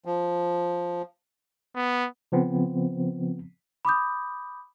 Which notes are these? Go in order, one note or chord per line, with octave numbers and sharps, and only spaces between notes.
F3
B3
C#3 F3 B3 C4
B5 D6 D#6 G6